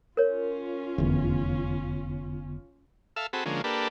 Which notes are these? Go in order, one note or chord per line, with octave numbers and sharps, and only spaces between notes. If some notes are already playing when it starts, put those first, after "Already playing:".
C#4 F4 A#4 C#5
F1 E2 D3 B3
A4 E5 F5
C4 F#4 G#4 A4 B5
D3 F3 G#3 A#3 C#4
A#3 D4 G4 A4 B4